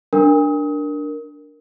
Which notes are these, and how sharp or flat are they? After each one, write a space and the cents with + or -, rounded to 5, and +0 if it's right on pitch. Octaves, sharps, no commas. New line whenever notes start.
D4 +0 A#4 +0 D#6 +35